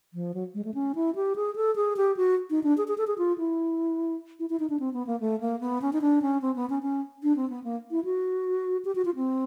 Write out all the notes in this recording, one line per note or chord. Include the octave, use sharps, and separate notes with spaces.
F3
F#3
G#3
A3
C#4
E4
G4
G#4
A4
G#4
G4
F#4
D#4
D4
G#4
G#4
A4
G#4
F4
E4
E4
E4
D#4
D4
C4
B3
A#3
A3
A#3
B3
C#4
D#4
D4
C#4
C4
B3
C#4
C#4
D4
C4
B3
A#3
E4
F#4
G4
F#4
F4
C4